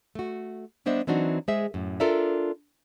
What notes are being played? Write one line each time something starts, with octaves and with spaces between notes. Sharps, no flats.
A3 F#4
G3 B3 D4 C5 D#5 E5
E3 F#3 C4 D4 D#4 F#4
G#3 G#4 C5 E5
F#2 A2
D4 F4 A4 A#4 D5 E5